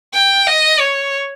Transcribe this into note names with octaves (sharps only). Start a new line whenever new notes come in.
G5
D#5
C#5